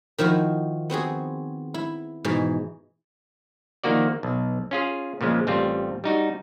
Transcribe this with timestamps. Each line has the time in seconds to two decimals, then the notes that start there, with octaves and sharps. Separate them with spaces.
0.18 D#3 F3 E4 F#4
0.90 B3 C4 F#4 G#4
1.74 E4
2.24 G#2 B2 E3
3.84 D#3 F3 A#3 F#4 D5
4.23 B1
4.71 C#4 F4 G#4
5.21 A#2 C#3 F3 G#3
5.47 A1 G3 C4 F4
6.04 G3 D#4 F#4